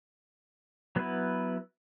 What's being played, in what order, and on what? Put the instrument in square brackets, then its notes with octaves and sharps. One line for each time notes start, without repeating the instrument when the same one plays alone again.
[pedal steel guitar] F#3 B3 E4 B4